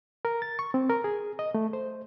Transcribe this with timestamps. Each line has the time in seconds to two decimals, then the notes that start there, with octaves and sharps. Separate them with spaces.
0.25 A#4
0.42 A6
0.59 C#6
0.74 C4
0.89 A#4
1.04 G#4
1.39 D#5
1.54 A3
1.73 C5